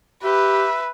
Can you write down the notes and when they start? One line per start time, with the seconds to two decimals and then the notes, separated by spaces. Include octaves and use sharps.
0.24 G4 B4 E5